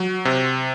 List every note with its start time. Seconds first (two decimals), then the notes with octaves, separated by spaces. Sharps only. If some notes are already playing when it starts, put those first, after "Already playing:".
Already playing: F#3
0.25 C3